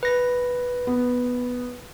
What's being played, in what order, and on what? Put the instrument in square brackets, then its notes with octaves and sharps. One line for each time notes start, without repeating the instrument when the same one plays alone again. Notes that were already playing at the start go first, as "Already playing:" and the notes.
[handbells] B4 A#6
[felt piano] B3